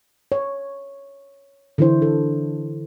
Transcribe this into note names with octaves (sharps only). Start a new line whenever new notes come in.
C#5
D3 E3 D4 E4 C5
A4